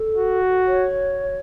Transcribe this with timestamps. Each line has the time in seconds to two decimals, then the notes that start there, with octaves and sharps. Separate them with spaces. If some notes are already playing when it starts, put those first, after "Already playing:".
Already playing: A4
0.16 F#4
0.67 C#5